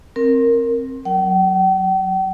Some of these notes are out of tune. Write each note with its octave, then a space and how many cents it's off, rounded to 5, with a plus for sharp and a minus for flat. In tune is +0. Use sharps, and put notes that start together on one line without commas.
C4 +25 A#4 -5
F#3 +0 G5 -45